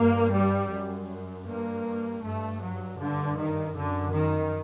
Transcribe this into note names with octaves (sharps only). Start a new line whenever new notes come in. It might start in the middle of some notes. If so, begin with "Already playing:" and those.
Already playing: G2 A#3
G3
F#2
G2 A#3
G2 A3
F#3
G2 D3
D#3
F#2 D3
D#3